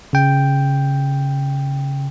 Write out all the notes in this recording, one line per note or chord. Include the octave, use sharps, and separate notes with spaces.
C#3 G5